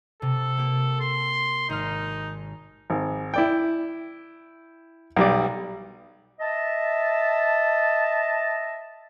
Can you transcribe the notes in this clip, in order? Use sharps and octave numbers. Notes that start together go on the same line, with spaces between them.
C3 A4
A#3 G4
C6
G#1 D#4 F6
G#1
E4 D5 G5
B1 G3 D5
D#5 E5 A5